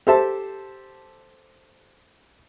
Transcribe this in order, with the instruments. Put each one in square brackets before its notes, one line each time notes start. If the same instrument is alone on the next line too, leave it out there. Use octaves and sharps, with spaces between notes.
[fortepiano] G4 A4 C5 E5 A5